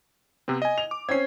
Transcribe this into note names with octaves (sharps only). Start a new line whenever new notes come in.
C3 B3 C4
D#5 G#5
F7
D6
C4 C#4 G#6 C7